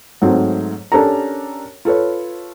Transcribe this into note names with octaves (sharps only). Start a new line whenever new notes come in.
G#2 F#3 A3 C4
C#4 D4 G4 A4 A#4 A#5
F4 A4 B4 C#5